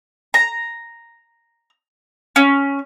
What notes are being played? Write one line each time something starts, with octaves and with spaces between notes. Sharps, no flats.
A#5
C#4